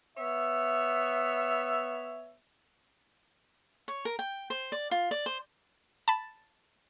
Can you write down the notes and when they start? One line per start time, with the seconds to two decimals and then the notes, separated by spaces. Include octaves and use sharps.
0.18 B3 C#5 E5
3.88 C#5
4.05 A#4
4.19 G5
4.50 C5
4.72 D5
4.91 F4
5.11 D5
5.26 C5
6.08 A5 B5